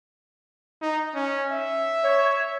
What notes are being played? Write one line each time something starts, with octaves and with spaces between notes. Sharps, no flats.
D#4
C#4
E5
C#5